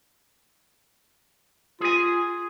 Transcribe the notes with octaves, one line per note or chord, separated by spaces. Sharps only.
F4 G#4 G#5